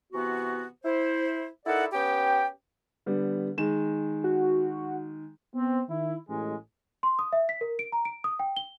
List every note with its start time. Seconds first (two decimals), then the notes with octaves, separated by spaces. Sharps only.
0.12 C3 E3 B3 F#4
0.84 E4 C5
1.66 D#4 E4 A4 A#4 D5 F#5
1.92 B3 C#4 G4 G5
3.06 D3 G3 B3
3.58 D#3 G#3 E7
4.24 F#4
5.54 B3 C4
5.89 D#3 E4
6.28 A1 G#3
7.03 C6
7.19 D#6
7.33 E5
7.49 B6
7.61 A#4
7.79 D7
7.92 A#5
8.05 D7
8.24 D#6
8.39 G5
8.57 G7